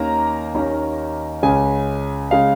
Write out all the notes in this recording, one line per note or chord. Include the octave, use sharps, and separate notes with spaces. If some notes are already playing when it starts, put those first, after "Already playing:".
Already playing: D#2 D#3 A#3 C#4 A#5
D#2 D#3 A#3 C#4
C#2 C#3 G#3 C#4 G#5
C#3 G#3 C#4 F5